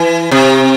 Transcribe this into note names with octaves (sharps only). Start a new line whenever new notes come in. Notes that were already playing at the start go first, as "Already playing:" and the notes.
Already playing: E3
C3